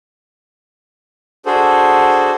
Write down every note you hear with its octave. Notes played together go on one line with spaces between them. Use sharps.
D4 F#4 G#4 A4 C5